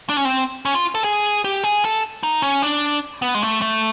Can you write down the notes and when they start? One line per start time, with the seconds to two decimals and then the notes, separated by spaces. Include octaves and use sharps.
0.09 D4
0.17 C#4
0.25 C4
0.65 C#4
0.75 F4
0.95 A4
1.04 G#4
1.44 G4
1.64 G#4
1.84 A4
2.23 D#4
2.42 C#4
2.62 D4
3.22 B3
3.35 G#3
3.42 A3
3.62 A3